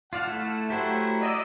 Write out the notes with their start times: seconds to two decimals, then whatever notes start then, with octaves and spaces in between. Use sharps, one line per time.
0.13 F4 D5 F5 F#5 A5
0.27 A3 E4 A4
0.70 F#3 A3 E4 G4 C5 F#5
1.21 D5 D#5 E6